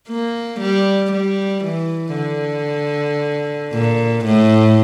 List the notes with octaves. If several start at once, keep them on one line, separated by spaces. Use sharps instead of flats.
A#3
G3
G3
E3
D3
A#2
A2